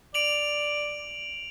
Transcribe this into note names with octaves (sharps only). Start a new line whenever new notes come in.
D5 D7 F7 F#7